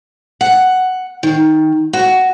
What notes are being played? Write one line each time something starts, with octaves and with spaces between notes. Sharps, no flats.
F#5
D#3
F#4